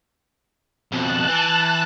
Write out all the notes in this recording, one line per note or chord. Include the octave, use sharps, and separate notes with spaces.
F2 B2 A5 F#6
E3